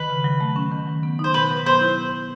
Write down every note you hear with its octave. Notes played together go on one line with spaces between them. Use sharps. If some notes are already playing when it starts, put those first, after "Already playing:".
Already playing: D#3 B4
C#3
F#3
A3
C#4
D#3
F#3
B3
D#4 C5
B2 B4
F#3
B3 C5
E4